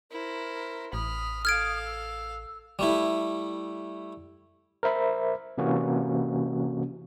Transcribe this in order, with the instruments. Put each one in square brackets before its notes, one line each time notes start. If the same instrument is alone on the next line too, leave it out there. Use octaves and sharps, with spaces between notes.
[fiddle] E4 C5 [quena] A#4
[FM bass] A1 [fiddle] B5 F6 [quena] D#6
[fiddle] A4 F5 [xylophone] F6 G#6 D7
[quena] E6
[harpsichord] G3 A3 E4
[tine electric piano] A#4 C5 E5 B5
C3 E3 A#3 C#4 F#4